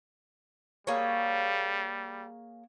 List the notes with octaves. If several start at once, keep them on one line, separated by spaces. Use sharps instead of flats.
G3 A#3 G#4 C#5